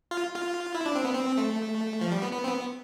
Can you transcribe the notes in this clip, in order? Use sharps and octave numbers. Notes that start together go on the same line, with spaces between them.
F4
F4
E4
D4
C4
B3
C4
A3
F3
G3
B3
B3
C4
B3